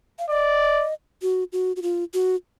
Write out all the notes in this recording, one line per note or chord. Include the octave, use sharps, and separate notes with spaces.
F5
D5 D#5
F#4
F#4
F#4
F4
F#4